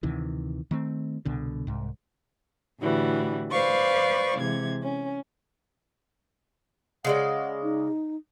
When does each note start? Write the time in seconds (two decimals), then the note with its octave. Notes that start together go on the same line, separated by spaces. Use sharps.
0.03 D2 C3 D#3 E3
0.71 D#3 A3 C4
1.25 C2 B2 D3
1.67 C2 G#2
2.80 A2 D3 E3 G3 F#4
3.51 B4 C5 D5 F5 C#6
4.37 C3 E3 G#3 G#6
4.83 C#4
7.05 C#3 G#3 D5 F#5
7.63 D#4